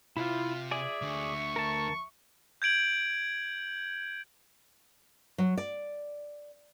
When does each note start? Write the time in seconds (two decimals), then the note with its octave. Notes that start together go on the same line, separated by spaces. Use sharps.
0.17 C3 E4 F4
0.71 G#4 D5 E5 G#5
1.02 D2 D3 C#6
1.56 A#4 A5
2.62 G6 G#6 D7 F#7
5.38 F#3
5.58 D5